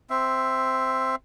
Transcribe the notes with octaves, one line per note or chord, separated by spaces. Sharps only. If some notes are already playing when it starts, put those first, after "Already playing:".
C4 E5